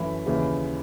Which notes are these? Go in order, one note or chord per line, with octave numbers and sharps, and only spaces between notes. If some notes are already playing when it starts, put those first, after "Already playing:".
Already playing: F#2 E3 A3 B5
D#2 C#3 E3